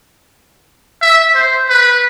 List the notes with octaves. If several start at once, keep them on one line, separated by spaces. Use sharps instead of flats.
E5
C5
B4